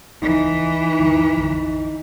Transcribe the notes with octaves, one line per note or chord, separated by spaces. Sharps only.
D#1 C#2 E3 D#4
D2 G2
A#1 F2 D3